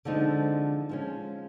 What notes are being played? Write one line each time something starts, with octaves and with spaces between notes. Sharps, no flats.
D3 F3 G#3 C4 D#4
F3 G#3 C#4